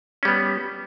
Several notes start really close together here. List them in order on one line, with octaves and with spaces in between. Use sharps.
C#4 G3 B3